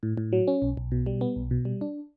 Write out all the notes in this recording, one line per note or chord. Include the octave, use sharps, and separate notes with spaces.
A2
A2
F#3
C#4
B1
B1
B2
G3
B3
B1
B2
G3
D4